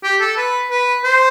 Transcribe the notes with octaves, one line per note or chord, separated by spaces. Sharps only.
G4
A4
B4
B4
C5